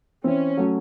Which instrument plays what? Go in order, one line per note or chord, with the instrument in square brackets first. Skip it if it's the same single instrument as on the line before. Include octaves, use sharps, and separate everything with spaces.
[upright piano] E3 C4 E4 [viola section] C#4
[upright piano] F#3 A3 C#4 F#4